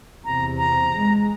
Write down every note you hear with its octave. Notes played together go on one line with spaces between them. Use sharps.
E2 C3 A#5
A#5
G#3